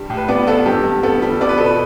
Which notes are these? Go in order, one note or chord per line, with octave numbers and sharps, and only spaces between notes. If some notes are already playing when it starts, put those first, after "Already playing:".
Already playing: G2 G3
A2
B4
B3 D5
B3 A4
G2 G4
G2
B3 A4
G3
B3 D5
B4
B2 A4
B4